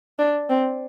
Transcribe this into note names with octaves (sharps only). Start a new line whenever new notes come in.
D4
C4